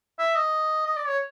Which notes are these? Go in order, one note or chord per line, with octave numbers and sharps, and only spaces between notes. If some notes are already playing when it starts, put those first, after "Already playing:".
E5
D#5
D#5
D5
C#5